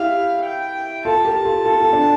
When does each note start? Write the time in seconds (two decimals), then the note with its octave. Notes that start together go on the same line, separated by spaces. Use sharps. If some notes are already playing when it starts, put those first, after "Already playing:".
Already playing: E4 G4 F5
0.45 G5
1.05 F4 A4 A5
1.25 G4 A#4
1.35 A5
1.45 F4 A4
1.65 F4 A4
1.81 F4 A4
1.93 D4